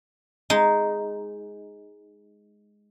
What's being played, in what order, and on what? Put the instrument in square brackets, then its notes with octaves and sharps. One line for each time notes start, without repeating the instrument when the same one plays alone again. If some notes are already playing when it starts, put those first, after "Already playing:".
[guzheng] G#3 D#4